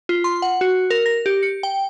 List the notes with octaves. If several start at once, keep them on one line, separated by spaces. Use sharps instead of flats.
F4
C6
F#5
F#4
A#4
A#6
G4
C#7
G5